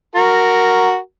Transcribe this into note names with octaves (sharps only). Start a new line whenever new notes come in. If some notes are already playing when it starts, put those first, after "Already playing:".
F#4 A#4